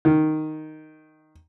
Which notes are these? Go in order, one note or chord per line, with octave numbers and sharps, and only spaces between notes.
D#3